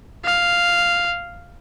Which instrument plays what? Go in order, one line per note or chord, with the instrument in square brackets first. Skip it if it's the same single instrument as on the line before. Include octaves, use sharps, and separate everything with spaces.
[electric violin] F5